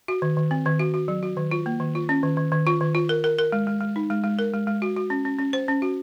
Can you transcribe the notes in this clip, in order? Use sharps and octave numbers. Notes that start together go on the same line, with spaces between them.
F#4
D#3
D#3
C4
D#3
F#4
F#4
F#3
F#4
D#3
F4
A#3
D#3
F4
C#4
D#3
D#3
D#3
F4
D#3
F4
A#4
A#4
A#4
G#3
G#3
G#3
D#4
G#3
G#3
A#4
G#3
G#3
F#4
F#4
C#4
C#4
C#4
C5
C#4
F#4